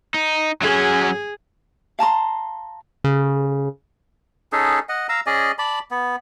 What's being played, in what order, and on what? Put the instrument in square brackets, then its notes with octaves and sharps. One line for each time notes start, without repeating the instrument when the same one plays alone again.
[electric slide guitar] D#4
[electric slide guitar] F#3 C#4 [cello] G#4
[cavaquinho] F5 A5 A#5 C6
[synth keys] C#3
[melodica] C#4 D#4 G#4 A4
D#5 F#5
F5 A#5 E6
C#4 G#4 D5 D#5
D5 A5 B5
B3